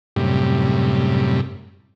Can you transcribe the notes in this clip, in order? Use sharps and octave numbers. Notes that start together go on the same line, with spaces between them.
F#2 A2 C3 G3